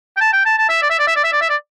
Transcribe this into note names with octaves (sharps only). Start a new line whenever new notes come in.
G5
A5
G5
A5
A5
E5
D5
E5
D5
E5
D5
E5
D5
E5
D5